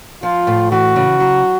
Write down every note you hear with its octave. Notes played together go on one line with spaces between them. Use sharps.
F3 F4
A2
E3 F#4
C#3
F#3